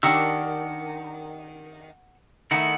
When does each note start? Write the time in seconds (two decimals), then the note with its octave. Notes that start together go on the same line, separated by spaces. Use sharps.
0.03 D#3 D4 G4 A#4 F#5 C#6 E6
2.51 D#3 A3 D#4 E4 F#5